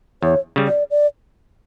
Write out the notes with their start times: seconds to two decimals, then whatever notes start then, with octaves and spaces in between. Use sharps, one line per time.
0.22 E2 C#5
0.56 C#3 G3
0.67 D5
0.91 D5